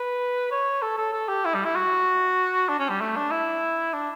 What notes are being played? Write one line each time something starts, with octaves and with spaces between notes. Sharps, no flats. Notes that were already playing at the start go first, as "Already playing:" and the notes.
Already playing: B4
C#5
A4
A4
A4
G4
E4
G3
E4
F#4
D4
C#4
G3
A3
D4
E4
D4